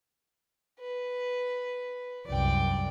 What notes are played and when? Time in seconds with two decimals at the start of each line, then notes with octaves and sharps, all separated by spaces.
0.80 B4
2.28 C2 F#2 D5 G5